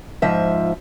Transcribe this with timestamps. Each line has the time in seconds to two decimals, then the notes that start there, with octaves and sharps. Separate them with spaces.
0.22 G#2 F3 E5